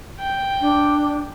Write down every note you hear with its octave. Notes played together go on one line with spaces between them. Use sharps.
G5
D4